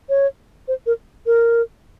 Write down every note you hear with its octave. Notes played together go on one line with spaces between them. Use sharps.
C#5
C5
A#4
A#4